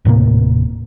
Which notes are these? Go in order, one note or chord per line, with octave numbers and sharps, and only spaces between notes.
D#1 A2 C3 A#3